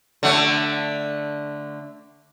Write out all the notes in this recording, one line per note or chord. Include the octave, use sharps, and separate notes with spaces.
D3 A3